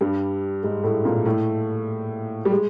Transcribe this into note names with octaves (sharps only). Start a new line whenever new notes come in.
G2 G3
G#2 G#3
A2 A3
A#2 A#3
A2 A3
G3
G#3